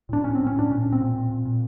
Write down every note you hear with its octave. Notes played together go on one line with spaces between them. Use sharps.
A2 D4
A2 C#4
A2 C4
C#4
A2 D4
A#2 C#4
A#2
C4
A#2
A#2
A#2
A#2